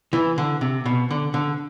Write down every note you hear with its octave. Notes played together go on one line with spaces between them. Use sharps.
E3
D3
C3
B2
D3
D3